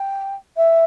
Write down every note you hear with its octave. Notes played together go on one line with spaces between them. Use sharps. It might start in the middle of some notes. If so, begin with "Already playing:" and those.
Already playing: G5
E5